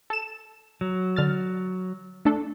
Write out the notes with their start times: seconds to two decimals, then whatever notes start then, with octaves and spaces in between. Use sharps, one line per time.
0.10 A4 E7
0.81 F#3
1.16 D3 F6 A6
2.25 A3 D4 A4